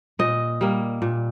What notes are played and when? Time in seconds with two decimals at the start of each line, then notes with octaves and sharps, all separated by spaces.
0.19 A#2 D#5
0.61 G3 A#3
1.02 A#2